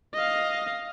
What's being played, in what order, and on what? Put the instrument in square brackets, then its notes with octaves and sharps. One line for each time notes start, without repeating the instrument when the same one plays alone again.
[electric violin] D#5 F5